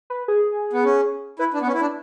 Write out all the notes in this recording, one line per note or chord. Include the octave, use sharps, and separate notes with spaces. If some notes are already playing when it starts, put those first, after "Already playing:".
B4
G#4
B3
C#4
E4 B4
D4
B3
C#4
E4
D4